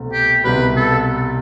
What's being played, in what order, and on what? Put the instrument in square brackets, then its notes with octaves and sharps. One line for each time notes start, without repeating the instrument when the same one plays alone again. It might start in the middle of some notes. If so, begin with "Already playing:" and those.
Already playing: [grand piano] C2 B2 A3 C4
[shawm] G4
[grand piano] C2 B2 G3 [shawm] B4
[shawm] A4